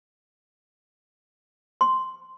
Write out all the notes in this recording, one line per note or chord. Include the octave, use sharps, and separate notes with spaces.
C6